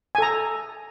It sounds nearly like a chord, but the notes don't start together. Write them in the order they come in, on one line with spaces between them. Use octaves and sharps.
G#5 A4 A#5